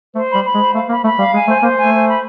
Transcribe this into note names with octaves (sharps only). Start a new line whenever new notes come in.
A3 C5
G3 B5
B5
G#3
C5
A3 F5
A#3 B5
A3 B5
G3 F5
G#3 G#5
A3 C5
A#3 C5
A3 G#5
C5
B5